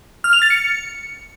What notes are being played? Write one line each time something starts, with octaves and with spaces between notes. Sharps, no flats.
F6
F7
A6
C#7